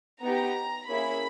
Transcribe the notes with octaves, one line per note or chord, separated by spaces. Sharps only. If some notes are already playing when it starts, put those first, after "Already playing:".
B3 D#4 G4 A#5
A#3 C#4 E4 G#4 B5